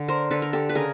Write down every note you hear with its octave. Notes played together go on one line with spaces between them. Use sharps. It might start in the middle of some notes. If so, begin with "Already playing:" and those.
Already playing: D3
A#4 C5
D3 A4 B4
A#4
G4 A4
B4
C#3 G#4 A#4